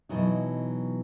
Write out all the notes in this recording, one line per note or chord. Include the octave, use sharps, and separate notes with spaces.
B2 E3 F#3 D#4